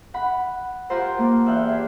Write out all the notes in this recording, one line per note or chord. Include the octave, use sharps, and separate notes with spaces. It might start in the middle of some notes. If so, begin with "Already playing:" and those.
F#5 B5
F4 G4 A#4 C5 F#5
A#3 A4
E2 E5 F5 G5 F#6
G4 G#4